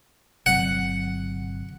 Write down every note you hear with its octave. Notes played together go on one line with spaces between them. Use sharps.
G1 C3 F#3 F#5